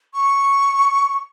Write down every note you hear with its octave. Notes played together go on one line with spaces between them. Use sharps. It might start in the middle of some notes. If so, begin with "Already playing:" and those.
C#6